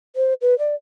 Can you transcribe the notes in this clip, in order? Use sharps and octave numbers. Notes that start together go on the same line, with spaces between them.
C5
B4
D5